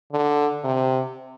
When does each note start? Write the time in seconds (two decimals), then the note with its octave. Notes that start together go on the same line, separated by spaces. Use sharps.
0.12 D3
0.64 C3